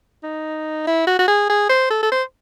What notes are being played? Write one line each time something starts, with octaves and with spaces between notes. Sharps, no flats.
D#4
E4
F#4
F#4
G#4
G#4
C5
A4
A4
C5